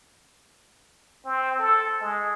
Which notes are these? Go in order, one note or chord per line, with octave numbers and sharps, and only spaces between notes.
C4
A4
G#3